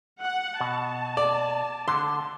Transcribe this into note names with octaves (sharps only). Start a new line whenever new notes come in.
F#5
B2 A5
D5
D3 C6